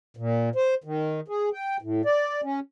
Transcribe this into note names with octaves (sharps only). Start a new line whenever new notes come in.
A#2
C5
D#3
G#4
G5
A2
D5
C#4